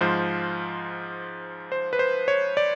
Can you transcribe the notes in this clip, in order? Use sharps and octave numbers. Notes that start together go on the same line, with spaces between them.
G#2 F3 C5
C5
B4
C5
C#5
D5